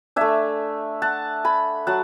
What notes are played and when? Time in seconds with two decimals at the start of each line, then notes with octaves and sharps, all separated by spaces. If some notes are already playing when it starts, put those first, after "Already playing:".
0.16 A3 D4 E5 G#5
1.02 F#5 A5
1.45 G#5 B5
1.87 F#3 F#5 A5